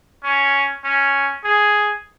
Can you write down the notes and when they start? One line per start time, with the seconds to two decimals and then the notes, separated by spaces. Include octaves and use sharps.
0.23 C#4
0.84 C#4
1.44 G#4